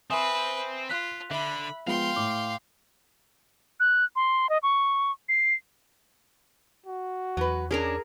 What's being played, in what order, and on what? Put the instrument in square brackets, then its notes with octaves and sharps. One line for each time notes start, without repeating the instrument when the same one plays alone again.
[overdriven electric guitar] C4 [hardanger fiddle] B4 [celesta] E5 G#5 D#6 [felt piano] C6
[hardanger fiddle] F4 [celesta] F#6 B6
[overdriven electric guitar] D3 [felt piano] E5 [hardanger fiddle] B5
[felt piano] F3 G#3 B3 [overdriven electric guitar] F5 [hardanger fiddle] G5 C6
[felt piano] A2 [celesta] D6
[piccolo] F#6
C6
D#5
C#6
C7
[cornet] F#4
[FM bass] E2 [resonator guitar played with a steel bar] F#3 B4
[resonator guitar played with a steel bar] C#4 D4 [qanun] G#4 A#4 A#5